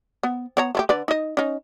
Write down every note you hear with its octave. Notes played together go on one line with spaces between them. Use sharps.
B3
B3 C#5 A#5
A3 E4 G4
D3 B4 D5
D#4 D#5
C#4 D#4